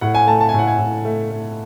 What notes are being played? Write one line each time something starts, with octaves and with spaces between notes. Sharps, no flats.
A2 F#5
G#5
A3 A5
A5
G#5
A2 F#5
G#5
A2
A3
A3